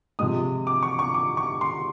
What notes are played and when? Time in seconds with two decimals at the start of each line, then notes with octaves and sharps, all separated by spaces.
0.19 C3 F3 G#3 D#6
0.67 D6
0.83 C#6
0.99 C#6
1.14 D6
1.37 C#6
1.61 C6